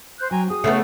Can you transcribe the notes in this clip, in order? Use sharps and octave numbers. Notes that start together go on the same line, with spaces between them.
C5 F#6 G6
F#3 G5 G#5 A#5
F#4 G#4 D#6
C#3 A3 B3 A4 C#5 E5